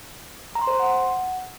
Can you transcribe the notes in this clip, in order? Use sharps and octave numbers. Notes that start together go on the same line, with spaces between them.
A#5
C6
C5
C6
F#5